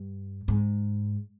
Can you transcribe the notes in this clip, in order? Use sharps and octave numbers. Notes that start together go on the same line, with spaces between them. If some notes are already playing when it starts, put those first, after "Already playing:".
Already playing: G2
G#2